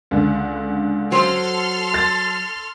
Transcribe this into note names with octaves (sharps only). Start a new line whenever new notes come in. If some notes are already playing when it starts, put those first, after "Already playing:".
C#2 D3
F#3 F#4 A4 C5 C6 F6
A6